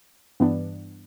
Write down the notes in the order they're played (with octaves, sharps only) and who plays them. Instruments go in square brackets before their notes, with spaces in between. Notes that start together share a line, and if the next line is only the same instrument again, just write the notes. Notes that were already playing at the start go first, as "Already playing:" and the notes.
[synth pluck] G2 E3 B3 D4